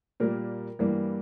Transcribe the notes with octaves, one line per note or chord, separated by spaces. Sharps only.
A#2 G3 A#3 A#4
G2 E3 G3 A#3